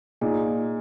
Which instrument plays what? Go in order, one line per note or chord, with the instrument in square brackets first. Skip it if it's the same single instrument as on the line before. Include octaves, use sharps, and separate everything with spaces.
[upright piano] A#2 [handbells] D#4 G#4 D#5 G#5